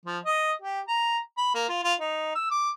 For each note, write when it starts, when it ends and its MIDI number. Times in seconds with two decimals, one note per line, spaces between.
0.05 0.18 53
0.25 0.52 75
0.62 0.80 67
0.88 1.18 82
1.38 1.51 83
1.55 1.64 58
1.69 1.80 65
1.83 1.93 65
2.00 2.33 63
2.35 2.49 88
2.51 2.70 86